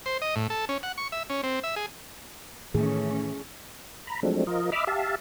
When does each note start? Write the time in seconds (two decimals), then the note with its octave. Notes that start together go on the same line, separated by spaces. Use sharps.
0.06 C5
0.22 D#5
0.36 A2
0.50 A4
0.69 C#4
0.83 F#5
0.98 C#6
1.12 E5
1.30 C#4
1.43 C4
1.64 E5
1.76 G#4
2.75 A2 D#3 E3 A3 C#4 G#4
4.07 A#5 B5
4.23 F3 F#3 G#3 A3 C4 D4
4.47 F3 F4 A#4 D#5
4.72 D#5 E5 B5 D6 E6 F6
4.87 G4 E5 F5 A5